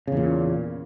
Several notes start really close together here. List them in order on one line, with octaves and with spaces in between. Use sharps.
C#3 E2 A#2